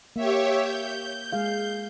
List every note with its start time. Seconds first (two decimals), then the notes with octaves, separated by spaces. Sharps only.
0.16 A#3 G4 C#5 E5
0.63 G6
1.32 G#3 G#4 F5